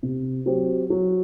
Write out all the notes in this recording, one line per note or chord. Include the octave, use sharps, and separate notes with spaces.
C3
F#3 C4 G4
F#3